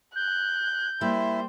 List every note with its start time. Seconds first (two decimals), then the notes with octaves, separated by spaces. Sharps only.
0.15 F#6 G6
1.01 G3 A#3 E4 C5 E5